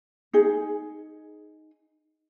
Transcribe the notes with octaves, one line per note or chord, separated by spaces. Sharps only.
D#4 G#4